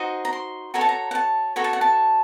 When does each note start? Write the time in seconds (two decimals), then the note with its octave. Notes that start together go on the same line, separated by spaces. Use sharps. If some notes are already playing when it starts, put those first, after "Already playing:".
Already playing: D#4 F#4 C5 D#5
0.25 A#5
0.33 C6
0.74 F#4 A4 C#5 A#5
0.81 A5
0.89 A#5
1.11 F#5
1.15 A5
1.56 F#4 A4 C#5 A#5
1.64 A5
1.73 F#5
1.81 A5